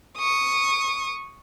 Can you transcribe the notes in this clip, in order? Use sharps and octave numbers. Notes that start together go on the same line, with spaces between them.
C#6 D#6